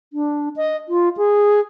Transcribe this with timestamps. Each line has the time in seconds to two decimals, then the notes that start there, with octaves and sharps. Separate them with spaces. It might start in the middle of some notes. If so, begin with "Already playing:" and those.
0.13 D4
0.56 D#5
0.89 F4
1.17 G#4